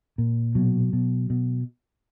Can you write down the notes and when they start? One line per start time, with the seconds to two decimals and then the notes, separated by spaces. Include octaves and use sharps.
0.18 A#2
0.55 B2 F#3
0.93 B2
1.30 B2